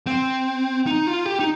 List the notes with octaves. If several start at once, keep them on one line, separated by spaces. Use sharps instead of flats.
C4
D#4
F4
G4
D#4